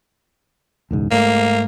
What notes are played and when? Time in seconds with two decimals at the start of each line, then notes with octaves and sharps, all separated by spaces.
0.91 E1 C#2 G#2
1.12 G#2 A3 A#3